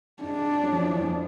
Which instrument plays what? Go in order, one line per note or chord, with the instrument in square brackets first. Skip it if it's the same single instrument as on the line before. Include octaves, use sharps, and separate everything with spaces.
[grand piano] G#2 G#3 [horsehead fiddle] D4
[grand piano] F#2 F#3
F2 F3
E2 E3
E2 E3
F2 F3